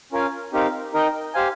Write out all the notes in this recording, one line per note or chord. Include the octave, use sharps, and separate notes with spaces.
C#4 F4 A#4 F5 G#5
C4 D#4 G4 A#4 F5
D#4 A#4 D#5 G5
G4 C5 F5 G#5